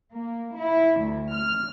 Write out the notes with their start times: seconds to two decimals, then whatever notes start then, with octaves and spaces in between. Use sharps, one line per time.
0.15 A#3
0.57 E4
1.00 D2
1.34 F6